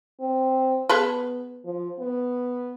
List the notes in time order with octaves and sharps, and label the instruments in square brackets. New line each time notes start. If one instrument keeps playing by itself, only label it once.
[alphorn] C4
[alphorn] B3 [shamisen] G#4 A4 B4
[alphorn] F3
B3